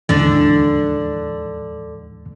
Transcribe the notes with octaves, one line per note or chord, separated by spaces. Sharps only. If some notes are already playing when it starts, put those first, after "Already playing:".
D#2 G#2 D3 E3 D4